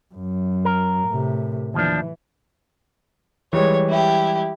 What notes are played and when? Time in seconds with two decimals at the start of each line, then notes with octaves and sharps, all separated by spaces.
0.15 F#2
0.65 A#4
1.08 A2 C3
1.74 D#2 E3 F3 D4
3.53 E3 G3 G#3 C#5
3.89 E4 G4